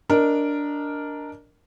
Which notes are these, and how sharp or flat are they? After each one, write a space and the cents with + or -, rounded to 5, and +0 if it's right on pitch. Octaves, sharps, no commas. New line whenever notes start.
D4 -10 A#4 +0 D#5 +0